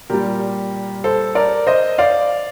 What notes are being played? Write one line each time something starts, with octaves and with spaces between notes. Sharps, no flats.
A#2 G3 G4 A#4
A4 C5
A#4 D5
C5 D#5
D5 F5